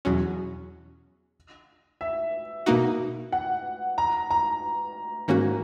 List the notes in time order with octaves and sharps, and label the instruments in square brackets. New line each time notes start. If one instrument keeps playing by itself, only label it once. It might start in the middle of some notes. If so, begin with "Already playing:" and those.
[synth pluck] E2 B2 F#3 C#4 F#4
[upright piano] E5
[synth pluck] B2 A#3 D#4 F#4
[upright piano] F#5
A#5
A#5
[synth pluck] G#2 D#3 A#3 C#4 F#4